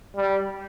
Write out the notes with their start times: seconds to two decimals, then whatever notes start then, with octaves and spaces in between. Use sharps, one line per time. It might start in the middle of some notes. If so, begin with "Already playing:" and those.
0.17 G3